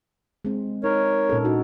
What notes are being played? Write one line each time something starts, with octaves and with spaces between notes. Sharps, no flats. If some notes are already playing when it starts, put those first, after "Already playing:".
G#3 C4
D#4 A#4 C#5
A#2 C#4 A4
D4 D#4 F#4